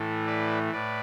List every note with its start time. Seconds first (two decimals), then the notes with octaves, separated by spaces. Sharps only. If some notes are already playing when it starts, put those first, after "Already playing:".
Already playing: A2 E3 A3
0.26 B4 D5
0.73 A2 B4 D5